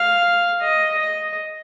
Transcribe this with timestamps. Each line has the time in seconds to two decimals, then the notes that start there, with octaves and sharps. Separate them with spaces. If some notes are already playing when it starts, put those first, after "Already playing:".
Already playing: F5
0.61 D#5
1.00 D#5